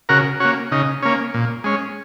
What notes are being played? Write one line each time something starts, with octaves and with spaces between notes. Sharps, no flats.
C#3 F#4 A#4
A#3 C#4 F#4
C#3 D#4
A#3 C#4
A#2
G#3 C#4